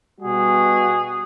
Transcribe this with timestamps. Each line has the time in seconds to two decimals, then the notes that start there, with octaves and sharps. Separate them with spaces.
0.20 B2 G3 F#4 G#4